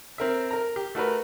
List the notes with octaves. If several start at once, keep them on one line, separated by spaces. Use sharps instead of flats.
C4 A#4 E5
A#4 A#5
G4
A3 F#4 A#4 B4